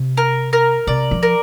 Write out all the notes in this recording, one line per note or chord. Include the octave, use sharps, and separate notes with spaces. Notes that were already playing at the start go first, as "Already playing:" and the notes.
Already playing: C3
A#4
A#4
C3 D5
F3
A#4